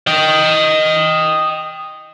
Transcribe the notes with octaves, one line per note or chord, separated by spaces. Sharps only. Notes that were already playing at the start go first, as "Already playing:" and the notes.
D#5 G5